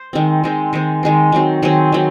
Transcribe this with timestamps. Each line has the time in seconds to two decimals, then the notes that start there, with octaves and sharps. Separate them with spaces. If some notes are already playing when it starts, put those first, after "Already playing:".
Already playing: C5
0.13 D#3 G#3 C4
0.44 D#3 G#3 C4
0.73 D#3 G#3 C4
1.03 D#3 G#3 C4
1.32 D#3 F#3 C4
1.62 D#3 F#3 C4 G#4
1.92 D#3 F#3 C4